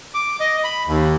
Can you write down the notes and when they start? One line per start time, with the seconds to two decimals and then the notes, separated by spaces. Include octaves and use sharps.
0.14 D6
0.40 D#5
0.64 B5
0.87 D#2